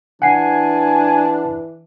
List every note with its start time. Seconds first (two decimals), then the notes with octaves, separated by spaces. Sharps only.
0.22 E3 D4 F#5 G#5 C7